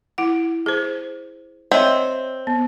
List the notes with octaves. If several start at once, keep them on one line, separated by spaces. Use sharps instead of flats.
E4 F#5
G#4 C5
C4 C#5 D#5 E5
B3